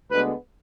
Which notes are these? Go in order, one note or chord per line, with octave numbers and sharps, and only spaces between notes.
D2 D3 G#3 B3 B4